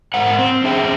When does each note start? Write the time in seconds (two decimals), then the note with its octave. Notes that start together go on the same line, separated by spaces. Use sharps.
0.14 G#2 A#4 C5 F#5
0.39 C4
0.64 C#4 D4 G#4 E5 G5